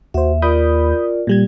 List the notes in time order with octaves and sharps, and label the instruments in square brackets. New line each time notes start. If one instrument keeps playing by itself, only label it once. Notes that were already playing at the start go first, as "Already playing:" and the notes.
[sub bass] D#2 [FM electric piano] F#4 C5 [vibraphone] E5
[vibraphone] F4 A#4 D5 [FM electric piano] B5 D#6 G6
[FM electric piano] A#2 G3 G#6